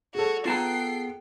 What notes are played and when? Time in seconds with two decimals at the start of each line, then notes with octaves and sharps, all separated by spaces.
0.15 F#4 G#4 A4 C#5
0.46 B3 F4 G5 A5 A#5 C7